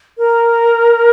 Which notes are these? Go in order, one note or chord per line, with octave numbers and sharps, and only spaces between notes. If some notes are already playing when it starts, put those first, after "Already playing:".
A#4